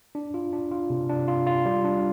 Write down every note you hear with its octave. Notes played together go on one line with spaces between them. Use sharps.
D4
F4
D4
F4
C3
D4
F4
F4
G3
D4